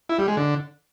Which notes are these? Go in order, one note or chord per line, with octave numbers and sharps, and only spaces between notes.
E4
G3
G#3
D3